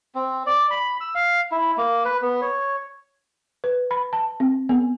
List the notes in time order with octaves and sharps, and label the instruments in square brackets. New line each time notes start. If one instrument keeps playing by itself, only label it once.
[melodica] C4
D5
B5
E6
F5
E4
A#3
B4
B3
C#5
[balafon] B4
B5
A5
C4
B3